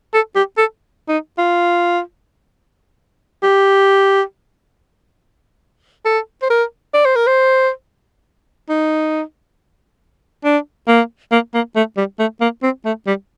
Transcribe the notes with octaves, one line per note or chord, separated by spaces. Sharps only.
A4
G4
A4
D#4
F4
G4
A4
C5
A#4
D5
C5
A#4
C5
D#4
D4
A#3
A#3
A#3
A3
G3
A3
A#3
C4
A3
G3